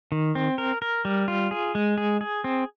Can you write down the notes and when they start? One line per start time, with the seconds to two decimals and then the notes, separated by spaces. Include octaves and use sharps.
0.12 D#3
0.35 C4
0.58 A#4
0.82 A#4
1.05 G3
1.28 F4
1.51 G#4
1.75 G#3
1.98 G#4
2.21 G#4
2.44 C4